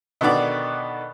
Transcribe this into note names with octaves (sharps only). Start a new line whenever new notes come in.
B2 D3 D#3 B3 D5